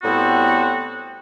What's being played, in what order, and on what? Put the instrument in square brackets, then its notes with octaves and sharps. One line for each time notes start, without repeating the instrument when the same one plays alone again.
[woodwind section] A2 G3 B3 C4 F#4